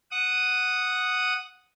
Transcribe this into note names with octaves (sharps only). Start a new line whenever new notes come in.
F#5 D#6